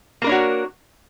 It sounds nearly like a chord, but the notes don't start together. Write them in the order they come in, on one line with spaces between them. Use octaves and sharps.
A#3 A#4 D4 C#5 F#4